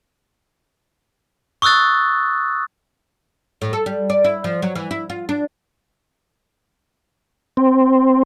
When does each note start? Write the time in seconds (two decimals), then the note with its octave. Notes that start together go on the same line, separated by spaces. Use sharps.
1.62 C#6 D#6 E6 F#6 A6
3.62 A2
3.73 A4
3.86 G3
4.10 D5
4.24 E4
4.44 F3
4.62 F#3
4.75 E3
4.91 E4
5.10 F4
5.29 D4
7.57 C4